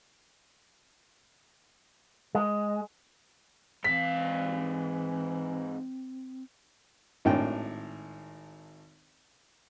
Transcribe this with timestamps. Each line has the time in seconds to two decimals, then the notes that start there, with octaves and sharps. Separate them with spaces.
2.35 G#3
3.84 G#2 E3 C4 F5 B6
7.25 G#1 A2 D4 G5